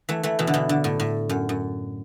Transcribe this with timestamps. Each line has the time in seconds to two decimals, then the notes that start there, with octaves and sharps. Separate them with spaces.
0.09 E3 A3
0.23 E3 A3
0.39 B2 E3
0.47 D3
0.54 B2 E3
0.69 D3
0.84 A2
1.00 A2
1.29 F#2
1.49 F#2